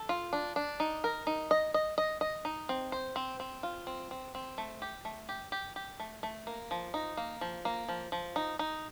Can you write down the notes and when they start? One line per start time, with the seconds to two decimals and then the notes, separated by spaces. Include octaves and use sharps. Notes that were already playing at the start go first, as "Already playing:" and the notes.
Already playing: A4
0.09 F4
0.33 D4
0.56 D4
0.80 D#4
1.04 A#4
1.27 D#4
1.51 D#5
1.74 D#5
1.98 D#5
2.21 D#5
2.45 D#4
2.69 C4
2.92 C5
3.16 C4
3.40 C4
3.63 F4
3.87 C4
4.11 C4
4.35 C4
4.58 A3
4.82 G4
5.05 A3
5.29 G4
5.52 G4
5.76 G4
6.00 A3
6.23 A3
6.47 A#3
6.71 F3
6.94 D#4
7.17 A#3
7.41 F3
7.65 A#3
7.88 F3
8.12 F3
8.36 D#4
8.59 D#4